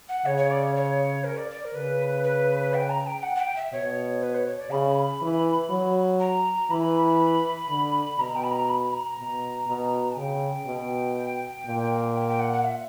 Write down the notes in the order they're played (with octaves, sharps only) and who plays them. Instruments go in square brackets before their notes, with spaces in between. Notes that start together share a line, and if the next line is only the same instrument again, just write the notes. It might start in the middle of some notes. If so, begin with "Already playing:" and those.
[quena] F#5
[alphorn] C#3 [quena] C#5
[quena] C#5
D5
C#5
C#5
A#4
D5
D5
A#4
[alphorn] C#3 [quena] B4
[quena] B4
G5
A#5
G5
F#5
F#5
G5
E5
[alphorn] B2 [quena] C#5
[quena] B4
C#5
C#5
D5
[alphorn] C#3 [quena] B5
[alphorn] E3
F#3
[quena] A#5
[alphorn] E3 [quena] B5
[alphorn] D3
[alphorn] B2 [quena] A#5
[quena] G5
B5
A#5
B5
A#5
[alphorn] B2
B2
[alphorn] C#3 [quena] G5
[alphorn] B2
A#2
[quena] G5
G5
F#5
F#5
E5